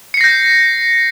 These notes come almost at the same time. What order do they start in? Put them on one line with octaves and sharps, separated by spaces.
C#7 C7 A#6 G6